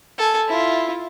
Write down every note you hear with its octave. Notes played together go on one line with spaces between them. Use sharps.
A4 G#5
E4 F4